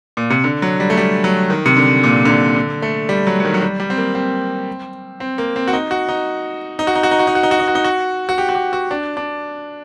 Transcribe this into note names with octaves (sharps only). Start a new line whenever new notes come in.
A#2
C3
D3
F#3
G3
A3
G3
F#3
D#3
C3
D3
A#2
D3
C3
D3
A3
G3
F#3
F#3
D#3
F#3
G3
G3
C4
A#3
C4
C4
A#3
C4
F#4
D#4
F#4
D#4
D#4
F#4
D#4
F#4
D#4
F#4
D#4
F#4
D#4
F#4
D#4
F#4
D#4
F#4
F#4
G4
F#4
G4
F#4
D4
D4